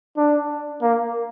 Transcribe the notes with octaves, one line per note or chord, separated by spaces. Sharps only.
D4
A#3